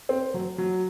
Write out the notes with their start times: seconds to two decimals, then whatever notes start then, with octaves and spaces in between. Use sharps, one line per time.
0.09 C4
0.34 F#3
0.58 F#3